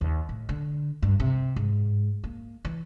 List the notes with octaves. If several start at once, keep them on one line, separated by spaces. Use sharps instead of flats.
D#2
A2
D3
G2
C3
G#2
A#3
E3